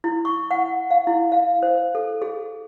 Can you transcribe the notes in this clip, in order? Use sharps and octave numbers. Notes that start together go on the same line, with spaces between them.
E4
C#6
F#5
F5
E4
F5
C5
A4
G#4